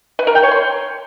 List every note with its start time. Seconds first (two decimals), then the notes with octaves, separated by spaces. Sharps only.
0.19 B4
0.27 A#4
0.35 G5
0.43 C#5
0.51 C6